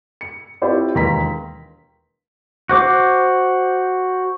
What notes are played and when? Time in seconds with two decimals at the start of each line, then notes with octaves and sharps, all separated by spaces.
0.21 C#7
0.62 C4 E4 F4 G4 C5 C#5
0.95 E1 D#2 B4 A#5 C6 B6
2.69 F#4 C5 D6